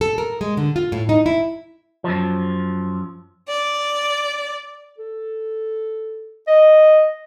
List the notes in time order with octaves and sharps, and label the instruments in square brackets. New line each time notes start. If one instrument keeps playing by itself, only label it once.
[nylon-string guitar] A4
A#4
G#3
D3
F4
A2
D#4
E4
[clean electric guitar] F#2 F3
[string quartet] D5
[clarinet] A4
D#5